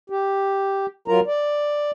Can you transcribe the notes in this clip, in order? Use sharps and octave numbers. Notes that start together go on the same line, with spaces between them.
G4
F#3 F4 A#4 A#5
D5